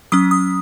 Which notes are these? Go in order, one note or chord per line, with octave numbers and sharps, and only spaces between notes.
F#3 C#4 D#6
D#6